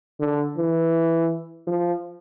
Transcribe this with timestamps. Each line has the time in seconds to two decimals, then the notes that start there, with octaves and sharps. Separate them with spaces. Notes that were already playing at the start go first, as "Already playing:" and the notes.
0.20 D3
0.57 E3
1.67 F3